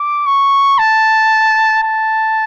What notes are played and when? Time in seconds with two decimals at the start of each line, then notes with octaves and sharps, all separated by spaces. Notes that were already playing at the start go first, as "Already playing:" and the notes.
Already playing: D6
0.26 C#6
0.78 A5
1.82 A5